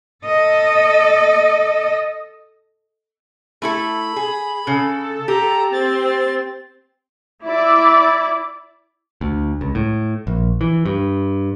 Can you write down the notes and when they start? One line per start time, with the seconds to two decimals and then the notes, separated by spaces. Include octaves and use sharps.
0.25 A4 D#5
3.62 A3 E4 A4 B5
4.16 G#4
4.67 C#3 A4
5.28 G4 A#5
5.73 C4 A6
7.43 E4 D5
9.21 D2
9.61 C#2
9.75 A2
10.27 A#1
10.61 E3
10.86 G2